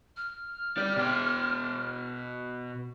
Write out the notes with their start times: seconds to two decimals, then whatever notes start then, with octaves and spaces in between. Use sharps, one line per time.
0.17 F6
0.77 G4 D5
0.97 B2 G5